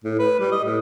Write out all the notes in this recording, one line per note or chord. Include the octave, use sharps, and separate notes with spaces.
A2
B4
G3
D#5
A2